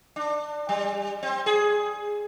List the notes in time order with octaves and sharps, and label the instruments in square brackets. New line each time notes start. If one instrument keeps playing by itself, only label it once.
[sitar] D4
G3
C4
G#4